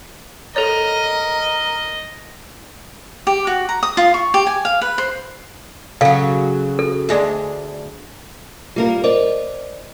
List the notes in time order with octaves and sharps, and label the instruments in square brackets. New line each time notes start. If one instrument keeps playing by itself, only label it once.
[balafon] A4 C#5 [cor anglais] A#4 [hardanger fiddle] D#5
[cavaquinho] G4
F#4
A#5
D#6
F4
C#6
G4
G#5
F5
B4
C5
[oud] C#3 F#3 [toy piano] A4 F5
[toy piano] A4
[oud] D2 G#3 D4
[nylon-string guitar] G3 A#3 A#4 [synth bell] F4
[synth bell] A#4 C5 D#5 [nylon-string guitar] D5